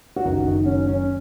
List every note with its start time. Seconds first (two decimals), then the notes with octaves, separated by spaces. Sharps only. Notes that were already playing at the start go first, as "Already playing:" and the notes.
0.16 F#4
0.25 F#1 F#2 D#3 D#4
0.46 D#4
0.66 C#4
0.87 C#4